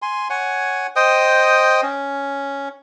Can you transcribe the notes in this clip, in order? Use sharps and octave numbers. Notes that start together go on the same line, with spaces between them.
G#5 C6
C#5 F#5 G#5
C5 D#5 G5 D#6
C#4